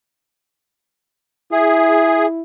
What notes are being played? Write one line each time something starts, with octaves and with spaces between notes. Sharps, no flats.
E4 G#4 E5